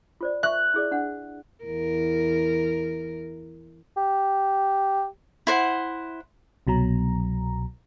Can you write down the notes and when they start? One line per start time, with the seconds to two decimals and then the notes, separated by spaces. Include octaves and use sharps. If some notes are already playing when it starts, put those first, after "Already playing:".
0.21 F4 C5 D5
0.43 E5 C#6 F#6
0.74 E4 G#4 D5
0.91 D4 F#5
1.64 E2 A#4
3.97 G4
5.47 E4 C5 F#5
6.67 C2 B2 F#3 A#5